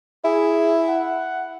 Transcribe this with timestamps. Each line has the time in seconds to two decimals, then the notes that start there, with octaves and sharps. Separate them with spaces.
0.25 E4 G#4
0.88 F#5